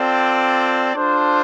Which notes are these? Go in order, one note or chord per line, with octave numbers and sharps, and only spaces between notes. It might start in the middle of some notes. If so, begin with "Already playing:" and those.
Already playing: C4 F4 A4 D5 G5
D4 F4 A4 C5